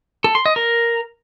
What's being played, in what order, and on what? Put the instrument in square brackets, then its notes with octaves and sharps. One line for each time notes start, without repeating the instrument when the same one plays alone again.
[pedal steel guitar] A4
C6
D#5
A#4